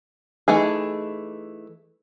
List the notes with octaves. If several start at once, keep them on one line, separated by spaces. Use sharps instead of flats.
E3 A3 D#4 G#4